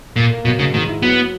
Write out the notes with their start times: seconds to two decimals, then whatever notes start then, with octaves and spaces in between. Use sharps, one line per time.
0.16 A#2 A#3
0.30 A#3
0.45 B2 F#3
0.59 G#2 C#3
0.74 G#2 D#3
0.88 E4
1.02 F#3 B3